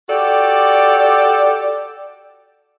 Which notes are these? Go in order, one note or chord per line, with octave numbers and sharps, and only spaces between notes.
F#4 G4 A4 D5